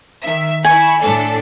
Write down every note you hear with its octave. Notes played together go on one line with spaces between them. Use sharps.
D#3 E5
E4 G#5 C#6
A2 D4 A4